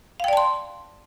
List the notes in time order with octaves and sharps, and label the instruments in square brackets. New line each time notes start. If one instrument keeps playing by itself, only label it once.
[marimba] F5
G5
D5
A5
C6